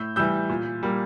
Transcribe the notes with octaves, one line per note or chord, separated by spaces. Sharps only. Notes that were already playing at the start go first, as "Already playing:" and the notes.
Already playing: A2 E6 G6
E3 G3 E6 G6
A#2
G3 A#3